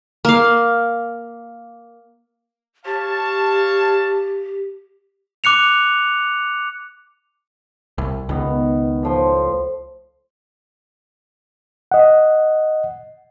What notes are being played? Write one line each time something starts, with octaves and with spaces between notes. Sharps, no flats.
A#3 F5
G4 C#5 F5 A5
D6 F#6 C#7 F7
C2
C#2 D#3 B3
A2 F3 C6
D#5 F#5